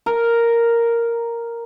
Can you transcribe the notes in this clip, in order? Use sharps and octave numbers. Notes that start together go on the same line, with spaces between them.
A#4